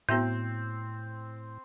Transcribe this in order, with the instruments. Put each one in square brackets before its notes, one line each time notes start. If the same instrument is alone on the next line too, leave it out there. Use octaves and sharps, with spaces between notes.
[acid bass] A2 [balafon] B3 F#4 E5 [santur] C4 [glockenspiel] G6